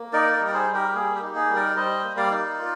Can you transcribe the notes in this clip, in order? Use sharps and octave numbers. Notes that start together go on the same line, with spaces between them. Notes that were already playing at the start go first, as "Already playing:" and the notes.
Already playing: A#3
D#4 A#4 D5
A#4 D5
G3
D5
G#4 C5
G3
G4 A#4
G4
A#3 G#4
G4
D#4
G#4
G3
A#4 D5
G3 C5 D#5
A#3
D5 F5
D#4
F4